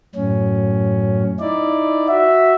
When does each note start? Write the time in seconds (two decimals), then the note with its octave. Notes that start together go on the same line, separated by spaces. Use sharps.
0.15 F#2 A2 C#4
1.40 D#4 E4 D5
2.08 F#4 E5